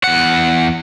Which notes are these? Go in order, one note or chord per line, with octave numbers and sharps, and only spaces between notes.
E2 F#5